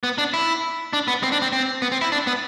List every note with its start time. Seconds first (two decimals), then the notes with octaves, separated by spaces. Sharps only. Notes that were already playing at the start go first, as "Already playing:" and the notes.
0.03 B3
0.18 D4
0.34 E4
0.93 D4
1.08 B3
1.23 C4
1.32 D4
1.42 C4
1.52 C4
1.82 B3
1.92 C4
2.02 E4
2.12 D4
2.27 B3